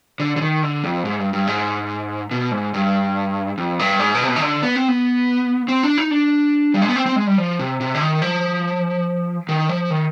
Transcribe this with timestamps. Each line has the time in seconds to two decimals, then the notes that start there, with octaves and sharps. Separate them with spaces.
0.20 D3
0.36 D3
0.42 D#3
0.63 D3
0.84 F2
1.05 G#2
1.19 G2
1.33 G2
1.47 G#2
2.31 B2
2.52 G#2
2.74 G2
3.58 F2
3.79 G2
4.00 G#2
4.15 B2
4.24 C3
4.28 B2
4.36 D#3
4.42 D3
4.63 B3
4.76 C4
4.88 B3
5.68 C4
5.83 D4
5.98 D#4
6.11 D4
6.74 G3
6.82 G#3
6.89 B3
6.96 C4
7.06 C4
7.16 G#3
7.27 G3
7.38 F3
7.59 C3
7.81 C3
7.95 D3
8.01 D#3
8.22 F3
9.49 D#3
9.69 F3
9.90 D#3